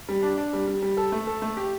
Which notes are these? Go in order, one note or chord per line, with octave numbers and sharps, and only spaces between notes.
G3
D4
D4
G3
G3
G3
A4
A3
A4
A3
G4